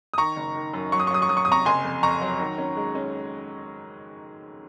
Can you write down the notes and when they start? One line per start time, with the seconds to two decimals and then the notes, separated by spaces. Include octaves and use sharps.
0.14 D#6
0.18 D#3 A#5 C#6
0.36 F#1
0.55 D#3
0.73 F#2
0.92 F#3 C#6
1.00 D#6
1.07 C#6
1.11 F#3 D#6
1.22 C#6
1.29 F#3 D#6
1.37 C#6
1.45 D#6
1.48 C3 A#5 C#6
1.66 F#1 G#5 C6
1.84 F2
2.03 F2 A#5 C#6
2.21 F#3
2.40 D#3
2.58 C#4
2.77 G#3
2.95 C#4